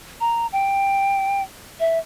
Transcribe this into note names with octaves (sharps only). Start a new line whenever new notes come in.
A#5
G5
E5